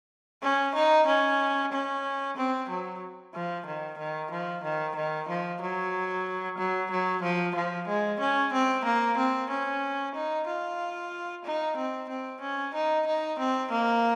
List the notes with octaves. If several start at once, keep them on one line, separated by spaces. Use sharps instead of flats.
C#4
D#4
C#4
C#4
C4
F#3
F3
D#3
D#3
F3
D#3
D#3
F3
F#3
F#3
F#3
F3
F3
G#3
C#4
C4
A#3
C4
C#4
D#4
F4
D#4
C4
C4
C#4
D#4
D#4
C4
A#3